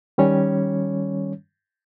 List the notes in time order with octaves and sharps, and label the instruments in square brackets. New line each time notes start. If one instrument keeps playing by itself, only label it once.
[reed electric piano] D#3 G3 C#4 C#5